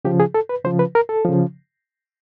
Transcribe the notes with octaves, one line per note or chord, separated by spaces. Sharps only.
C#3 F3 G4
G#4
A4
B4
C#3 F3 C5
B4
A#4
A4
C#3 F3